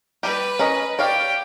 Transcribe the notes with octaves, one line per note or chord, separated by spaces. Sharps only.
G3 G4 B4
C#4 A#4 D#5
G4 C#5 D5 F5 G5